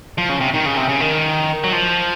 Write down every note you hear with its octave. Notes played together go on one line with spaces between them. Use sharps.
F3
C#3
C3
D#3
C#3
C3
C#3
D#3
F#3
F3